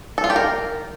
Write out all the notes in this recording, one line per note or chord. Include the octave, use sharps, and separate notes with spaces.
A4
F4
G4
A#4